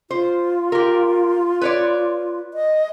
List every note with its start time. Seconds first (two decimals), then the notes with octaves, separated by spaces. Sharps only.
0.11 F4 C5
0.72 G4 A#4
1.62 B4 C#5 D5
2.54 D#5